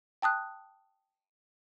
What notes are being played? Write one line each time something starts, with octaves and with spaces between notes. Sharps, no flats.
G5 A5 D#6 F#6